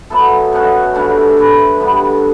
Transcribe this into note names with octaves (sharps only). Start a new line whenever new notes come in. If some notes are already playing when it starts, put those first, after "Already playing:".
F#3 B3 E4 A4
B2 A3 C#4 F#4
G2 D3 A3 C#4
E3 A3 D4
G2 D3 G3 B3